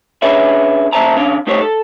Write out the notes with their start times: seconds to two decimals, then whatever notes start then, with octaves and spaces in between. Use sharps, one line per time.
0.22 C#4 D4 G#4 B4 C#5 E5
0.93 A#2 C#3 C5 E5 A5 A#5
1.17 C#3 C#4 D4 F5
1.47 A3 D#4 G4 C5 C#5
1.61 A4